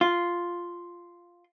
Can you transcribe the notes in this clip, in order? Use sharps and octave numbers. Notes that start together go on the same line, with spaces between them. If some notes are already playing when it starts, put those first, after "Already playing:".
F4